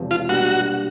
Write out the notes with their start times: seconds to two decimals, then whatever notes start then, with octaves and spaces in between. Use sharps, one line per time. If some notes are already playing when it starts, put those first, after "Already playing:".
Already playing: E1 E2 C3 F3
0.11 F4
0.29 B2 G3 A#3 D4 F#4 G4